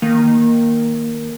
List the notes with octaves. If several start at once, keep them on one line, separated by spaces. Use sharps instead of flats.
D#3 A#3